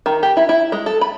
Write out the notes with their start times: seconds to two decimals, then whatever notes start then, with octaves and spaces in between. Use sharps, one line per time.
0.06 D#3
0.23 G4
0.37 E4
0.49 E4
0.72 G#3
0.86 A4
1.01 B5